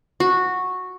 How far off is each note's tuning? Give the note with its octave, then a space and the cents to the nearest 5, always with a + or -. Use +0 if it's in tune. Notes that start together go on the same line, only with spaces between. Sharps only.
F#4 -10